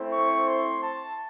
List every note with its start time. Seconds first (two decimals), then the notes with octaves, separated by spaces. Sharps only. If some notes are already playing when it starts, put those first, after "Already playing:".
Already playing: A3 C4 E4 C5
0.12 C#6
0.47 C6
0.83 A5